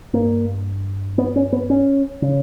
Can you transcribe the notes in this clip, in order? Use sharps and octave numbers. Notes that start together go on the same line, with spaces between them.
G2 A#3
B3
C#4
B3
C#4
C#3